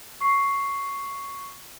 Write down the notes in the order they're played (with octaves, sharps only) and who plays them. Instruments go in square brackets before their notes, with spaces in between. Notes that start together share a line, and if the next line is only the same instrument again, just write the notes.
[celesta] C#6 C7